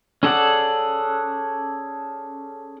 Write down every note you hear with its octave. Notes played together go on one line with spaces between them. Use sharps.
C#4 G#4 A4 D5 F#5